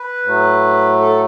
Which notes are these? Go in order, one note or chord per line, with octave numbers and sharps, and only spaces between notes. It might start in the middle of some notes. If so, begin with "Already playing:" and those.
Already playing: B4
A2 F#3 A3
A4